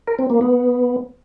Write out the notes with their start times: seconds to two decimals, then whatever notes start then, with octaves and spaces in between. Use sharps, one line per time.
0.07 A#4
0.19 C4
0.30 A#3
0.41 B3